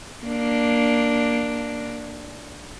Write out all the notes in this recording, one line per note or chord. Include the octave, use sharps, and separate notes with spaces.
A#3 D4